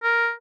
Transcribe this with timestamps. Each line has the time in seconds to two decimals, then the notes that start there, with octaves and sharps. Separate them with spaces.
0.03 A#4